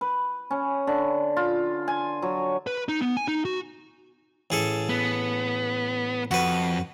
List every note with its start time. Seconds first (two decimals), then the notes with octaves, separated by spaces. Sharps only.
0.01 B4
0.51 C#4
0.87 D3
1.37 F4
1.88 G#5
2.22 F#3
2.67 B4
2.89 D#4
3.01 B3
3.17 G#5
3.28 D#4
3.45 F#4
4.50 A1 G#4 A4
4.90 B3
6.31 F2 F#4 B4